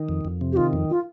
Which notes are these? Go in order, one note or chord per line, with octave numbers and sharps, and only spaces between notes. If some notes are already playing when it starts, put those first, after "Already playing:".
Already playing: D#3
F2
F2
C3
G4
D#3 F4
F2
F4